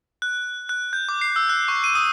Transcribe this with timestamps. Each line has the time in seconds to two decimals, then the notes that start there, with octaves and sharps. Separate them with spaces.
0.22 F#6
0.69 F#6
0.93 G6
1.09 D6
1.21 C7
1.36 E6
1.49 F#6
1.68 C#6
1.84 D#7
1.95 D#6